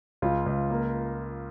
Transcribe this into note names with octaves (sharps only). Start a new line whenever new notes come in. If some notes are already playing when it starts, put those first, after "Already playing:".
C#2 F4
C#2
A#3